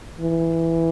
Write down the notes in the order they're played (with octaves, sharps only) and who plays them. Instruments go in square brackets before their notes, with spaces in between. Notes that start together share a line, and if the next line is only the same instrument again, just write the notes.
[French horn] E3